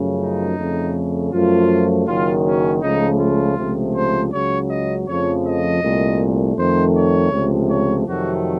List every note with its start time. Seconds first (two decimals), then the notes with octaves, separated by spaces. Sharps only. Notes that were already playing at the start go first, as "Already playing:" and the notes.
Already playing: F#2 C#3 F3 A3
0.19 D#4
0.56 F2 C#3 A3
1.32 F#2 F3 A3 F4
2.07 F#1 F#2 D#3 F#3 F4
2.45 C#4
2.82 C#2 C#3 F3 A3 D#4
3.19 F4
3.57 C#2 C3 F3 A3
3.94 C5
4.32 C#2 C#3 F#3 C#5
4.69 D#5
5.07 F2 C#3 F3 A3 C#5
5.44 D#5
5.82 C2 A#2 A3
6.56 F2 D#3 A3 C5
6.94 C#5
7.31 C#2 C3 F3 A3
7.70 C#5
8.06 F2 C3 D#3 F#3 A3 F#4